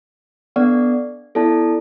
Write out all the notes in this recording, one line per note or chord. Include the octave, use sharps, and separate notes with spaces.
B3 D4 A4 D5 F#5
B3 E4 A4 D5 A5